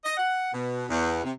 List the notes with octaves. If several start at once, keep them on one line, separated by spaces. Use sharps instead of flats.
D#5
F#5
B2
E2
C3